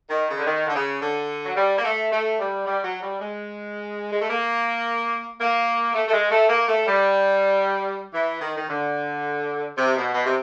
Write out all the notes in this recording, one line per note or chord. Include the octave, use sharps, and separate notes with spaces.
D#3
C#3
D3
D#3
D3
C#3
D3
F#3
G3
A#3
A3
A3
G3
G3
F#3
G3
G#3
G#3
A3
A#3
A#3
A3
A3
G#3
A3
A#3
A3
G3
E3
D#3
D#3
D3
C3
B2
B2
C3